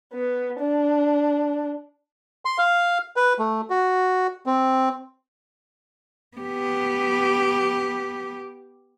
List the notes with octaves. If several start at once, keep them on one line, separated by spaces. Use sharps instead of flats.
B3
D4
C6
F5
B4
A3
F#4
C4
B3 G4